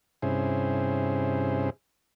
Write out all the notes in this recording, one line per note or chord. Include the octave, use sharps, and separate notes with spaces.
G2 C3 C#4 E4 G#4 C5